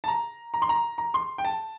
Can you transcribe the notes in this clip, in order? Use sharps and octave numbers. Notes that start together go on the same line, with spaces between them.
A5
A#5
A#5
C6
A#5
A#5
C6
G5
A5